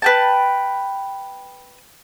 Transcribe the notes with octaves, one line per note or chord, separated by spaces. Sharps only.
B4 G5 A5